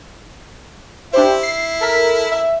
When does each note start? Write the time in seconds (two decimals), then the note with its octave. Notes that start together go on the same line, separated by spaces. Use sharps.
1.13 D4 E4 G4 C5
1.43 C7
1.81 A4 A#4 B6
2.31 E5